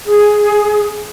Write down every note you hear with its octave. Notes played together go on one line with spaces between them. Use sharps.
G#4